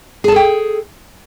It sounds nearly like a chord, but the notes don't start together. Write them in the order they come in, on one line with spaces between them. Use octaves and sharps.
G#4 A5 A4 G5